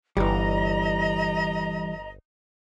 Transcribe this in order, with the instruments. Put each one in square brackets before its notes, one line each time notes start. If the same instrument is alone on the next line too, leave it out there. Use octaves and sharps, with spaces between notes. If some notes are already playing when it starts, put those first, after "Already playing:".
[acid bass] G1 [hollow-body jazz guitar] E3 G3 [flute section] D#5 A#5